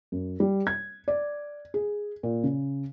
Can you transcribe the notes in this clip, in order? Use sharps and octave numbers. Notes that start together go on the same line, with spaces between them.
F#2
G3
G#6
D5
G#4
A#2
C#3